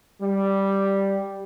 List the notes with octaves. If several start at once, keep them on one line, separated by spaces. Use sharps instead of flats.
G3